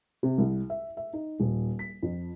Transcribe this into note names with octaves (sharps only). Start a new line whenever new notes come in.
C3
C2
E5
E5
D#4
D#1
B6
F2